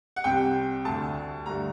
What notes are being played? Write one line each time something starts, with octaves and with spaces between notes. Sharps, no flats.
F#5
C2 C3 G3 G5
D2 D3 A3 A5
G2 D3 A3 A#5